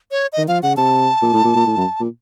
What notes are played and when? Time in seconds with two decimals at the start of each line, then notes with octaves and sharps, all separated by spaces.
0.11 C#5
0.33 D#3 D#5
0.48 F3 F5
0.63 C#3 F#5
0.77 C3 A5
1.22 A#2
1.33 A2
1.44 A#2
1.55 A#2
1.66 A2
1.77 F#2
2.00 A#2